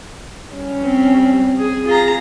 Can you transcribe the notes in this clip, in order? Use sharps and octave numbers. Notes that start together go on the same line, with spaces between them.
G3 C#4
C4
G#4
F4 G#4 A#5